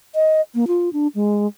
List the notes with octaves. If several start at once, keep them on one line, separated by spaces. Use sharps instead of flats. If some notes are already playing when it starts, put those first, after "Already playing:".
D#5
A#3
F4
D4
G#3